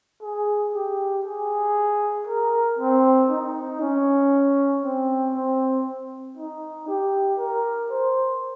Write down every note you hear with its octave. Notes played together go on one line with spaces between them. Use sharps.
G#4
G4
G#4
A#4
C4
D#4
C#4
C4
C4
D#4
G4
A#4
C5